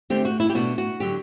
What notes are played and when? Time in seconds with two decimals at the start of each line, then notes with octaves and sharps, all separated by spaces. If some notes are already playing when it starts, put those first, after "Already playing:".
0.10 D3 A3 C4 G4
0.25 F#4
0.40 E4
0.50 G4
0.55 B2 A3 D4 F#4
0.78 F#4
1.00 D3 F#3 G4